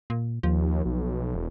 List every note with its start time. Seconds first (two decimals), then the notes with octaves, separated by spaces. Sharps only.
0.10 A#2
0.43 D#2 F3
0.86 B1
1.35 E1